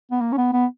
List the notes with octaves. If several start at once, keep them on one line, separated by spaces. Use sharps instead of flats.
B3
A#3
C#4
B3
B3